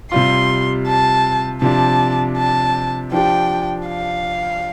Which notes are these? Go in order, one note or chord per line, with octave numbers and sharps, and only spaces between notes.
C3 G3 F4 C6
A5
C3 F3 D4 A5
A5
F3 D4 G4 G5
F5